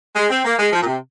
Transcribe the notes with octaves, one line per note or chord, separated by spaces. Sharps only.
G#3
C4
A#3
G#3
F3
A#2
C3